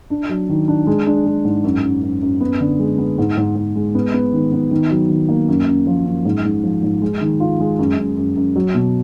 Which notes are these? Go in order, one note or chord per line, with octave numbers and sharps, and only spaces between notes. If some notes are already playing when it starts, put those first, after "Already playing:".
D4
F#3
D#3
D4
G#3
D4
G#3
G#2
F#2
F#2
F#2
F#2
B3
D3
G#3
B3
G#2
G#2
G#2
G#3
B3
B3
D#3
B3
D#3
F#3
D#3
A#3
F#2
F#2
F3
F#2
G#2
G#2
F3
G#2
G#3
D#3
F4
G#3
F#2
F#2
F#2
F#2
F#3
B2